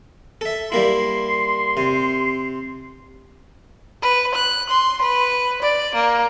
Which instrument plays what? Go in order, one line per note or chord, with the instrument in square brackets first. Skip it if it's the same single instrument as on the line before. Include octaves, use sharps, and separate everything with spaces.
[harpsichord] A4 E5
[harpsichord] G3 A#3 E4 [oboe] C6
[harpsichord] C3
[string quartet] B4
F#6
C6
B4
D5
A#3